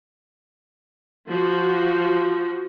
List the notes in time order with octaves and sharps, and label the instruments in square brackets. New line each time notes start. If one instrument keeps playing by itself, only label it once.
[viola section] F3 F#4